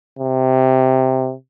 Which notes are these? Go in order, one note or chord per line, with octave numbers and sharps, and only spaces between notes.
C3